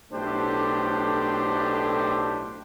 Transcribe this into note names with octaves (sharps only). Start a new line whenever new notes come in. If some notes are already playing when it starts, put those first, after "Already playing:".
B1 A2 A3 D4 G4 C5